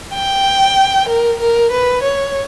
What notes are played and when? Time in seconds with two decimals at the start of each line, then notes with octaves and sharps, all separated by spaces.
0.14 G5
1.09 A#4
1.40 A#4
1.71 B4
2.03 C#5